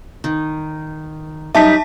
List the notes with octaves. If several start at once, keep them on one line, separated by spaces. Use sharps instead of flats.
D#3
F#2 G3 D#4 E5 A5 B6